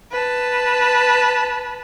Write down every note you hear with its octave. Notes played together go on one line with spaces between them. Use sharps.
B4 A5